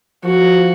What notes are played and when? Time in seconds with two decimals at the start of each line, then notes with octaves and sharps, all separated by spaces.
0.24 F3 F#4